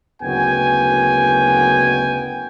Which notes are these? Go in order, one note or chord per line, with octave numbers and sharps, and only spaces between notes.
F#1 D2 B3 F#4 G5 G#5